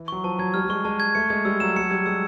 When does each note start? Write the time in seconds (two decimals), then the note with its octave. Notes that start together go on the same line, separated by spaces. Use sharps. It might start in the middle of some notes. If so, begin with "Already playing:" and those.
Already playing: E3
0.08 F#3 C#6
0.24 F3 A5
0.39 F#3 G#6
0.54 G3 F6
0.65 G3
0.70 G#3 C#6
0.85 G#3 A5
1.00 G#6
1.15 A3 C#7
1.30 G#3 G#6
1.45 G3 E6
1.60 F#3 E7
1.76 F#3 C#7
1.91 G3 G#6
2.06 G#3 E6